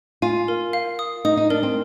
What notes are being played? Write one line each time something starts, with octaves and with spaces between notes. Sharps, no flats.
F4 G#5
A#4
F5
D#6
D#4 D#6
D#4
D4 A#4
C4